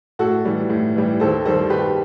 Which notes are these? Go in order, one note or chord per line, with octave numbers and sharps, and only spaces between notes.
A2 F#4 A4
E3 G3
A2
E3 G3
D#2 A4 C5
D#3 G3 A4 C5
D#2 G4 B4